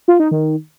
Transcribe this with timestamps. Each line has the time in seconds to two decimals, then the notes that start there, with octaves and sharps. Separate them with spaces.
0.08 F4
0.20 D#4
0.31 D#3